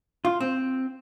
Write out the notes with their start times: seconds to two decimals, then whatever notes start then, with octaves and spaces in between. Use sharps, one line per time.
0.25 F4
0.41 C4